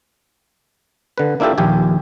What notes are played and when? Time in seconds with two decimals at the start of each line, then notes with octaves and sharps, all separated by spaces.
1.18 D3 B4
1.40 A#3 D4 E4 F4 G4 A4
1.58 A#1 D#2 G4 G#5